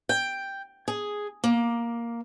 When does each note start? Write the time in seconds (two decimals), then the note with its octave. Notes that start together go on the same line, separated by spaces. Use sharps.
0.09 G5
0.88 G#4
1.44 A#3